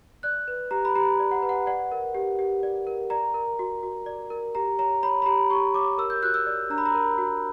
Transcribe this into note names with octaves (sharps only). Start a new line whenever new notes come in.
D5 F#6
B4
G4 A#5
B5
G4 A#5
D5
F#5
B4
F#5
D5 F#5
A#4
G4
G4
D5
A#4
D5 A#5
A#4
F#4
F#4
D5
A#4
G4 A#5
C#5 A#5
C#5 B5
B5
G4 A#5
G4 C#6
C#5 D6
A#4 E6
G6
F#4 F#6
E6
D5
D4 A#5
B5
A#5
A#4
F#4